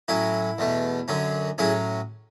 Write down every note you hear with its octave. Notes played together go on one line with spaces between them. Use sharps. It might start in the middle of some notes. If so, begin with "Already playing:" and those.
A2 F#3 C#4 E4
E2 B2 A3
F#2 D3 F#3 C#4
A2 F#3 C#4 E4 G#4